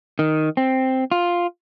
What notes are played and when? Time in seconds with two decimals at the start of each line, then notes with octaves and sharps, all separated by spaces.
0.19 D#3
0.57 C4
1.12 F4